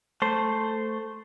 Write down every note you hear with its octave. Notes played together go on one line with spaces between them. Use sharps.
A3 C5